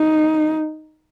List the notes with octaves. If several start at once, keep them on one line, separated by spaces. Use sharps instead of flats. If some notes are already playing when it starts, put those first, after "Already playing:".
Already playing: D#4